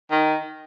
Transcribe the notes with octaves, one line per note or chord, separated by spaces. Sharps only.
D#3